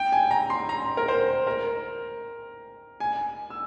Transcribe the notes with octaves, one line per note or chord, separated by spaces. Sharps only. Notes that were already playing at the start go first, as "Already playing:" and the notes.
Already playing: G5
G#5
A#5
C6
A#5
A#4
C5
A#4
G#5
E6